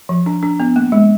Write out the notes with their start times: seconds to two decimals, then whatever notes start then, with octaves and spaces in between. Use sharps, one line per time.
0.09 F3
0.26 D4
0.43 D4
0.60 B3
0.76 A#3
0.92 G#3